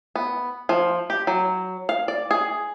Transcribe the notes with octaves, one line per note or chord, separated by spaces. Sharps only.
B3
F3
G4
F#3
F5
D5
G#4